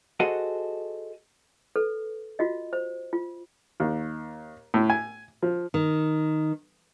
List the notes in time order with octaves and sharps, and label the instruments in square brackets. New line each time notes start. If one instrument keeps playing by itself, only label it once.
[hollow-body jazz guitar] F#4 G#4 A4 C5 D#5 F#5
[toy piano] A4 B4
F4 F#4 D#5
C5
F4
[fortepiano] D#2
A2
G#5
F3
[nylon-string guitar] D#3